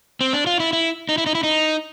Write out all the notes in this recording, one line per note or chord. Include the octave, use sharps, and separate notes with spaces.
C4
D4
F4
E4
E4
D#4
E4
D#4
E4
D#4